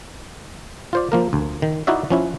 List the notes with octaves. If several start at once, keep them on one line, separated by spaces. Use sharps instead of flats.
F4 C5 D5
F3 A#3 A#4
D2
D#3
D#4 E4 F#4 D5 E5
F3 C#4 E4